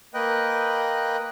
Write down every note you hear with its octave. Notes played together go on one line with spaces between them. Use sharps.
A#3 B4 D#5 G5 F#6